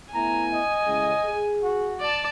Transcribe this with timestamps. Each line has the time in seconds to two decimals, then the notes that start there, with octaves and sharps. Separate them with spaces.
0.14 A3 B3 E4 G#5 A#5
0.52 D#5
0.86 A2 C#3 G#3
1.25 G#4
1.63 F#4
2.01 D5 A5